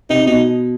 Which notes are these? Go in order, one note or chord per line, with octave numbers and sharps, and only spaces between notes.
C3 D#4
B2 D#4